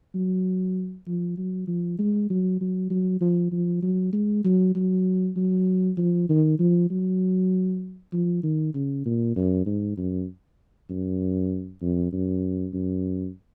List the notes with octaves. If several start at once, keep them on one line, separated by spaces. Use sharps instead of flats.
F#3
F3
F#3
F3
G#3
F#3
F#3
F#3
F3
F3
F#3
G#3
F#3
F#3
F#3
F3
D#3
F3
F#3
F3
D#3
C#3
A#2
F#2
G#2
F#2
F#2
F2
F#2
F#2